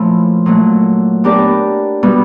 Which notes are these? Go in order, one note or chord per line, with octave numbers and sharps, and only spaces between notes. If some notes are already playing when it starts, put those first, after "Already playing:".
Already playing: A#2 F3 A3 C#4 E4
A#2 F#3 A3
B3 D4 G4 A#4 D5
B2 G3 B3